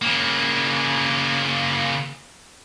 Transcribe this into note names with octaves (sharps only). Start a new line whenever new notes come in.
C#3 A#3